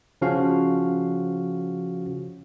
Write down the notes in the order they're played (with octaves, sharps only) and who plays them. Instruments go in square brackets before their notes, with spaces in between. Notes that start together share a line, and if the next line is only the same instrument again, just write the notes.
[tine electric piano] C#3 F3 C#4 F#4 F5